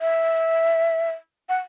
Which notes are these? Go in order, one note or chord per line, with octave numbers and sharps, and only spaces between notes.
E5
F#5